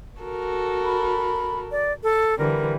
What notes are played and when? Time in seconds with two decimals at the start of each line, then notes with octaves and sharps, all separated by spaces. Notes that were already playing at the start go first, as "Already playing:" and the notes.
0.21 F#4 A4 A#4
0.85 B5
1.72 D5
2.03 A4
2.38 D3 E3 G3 A#4